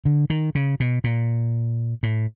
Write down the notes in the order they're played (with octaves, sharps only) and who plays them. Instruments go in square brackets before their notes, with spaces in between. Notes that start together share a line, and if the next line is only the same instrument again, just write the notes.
[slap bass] D3
D#3
C#3
B2
A#2
A2